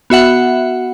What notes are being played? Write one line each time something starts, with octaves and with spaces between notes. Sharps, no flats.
B3 F#4 E5 F#5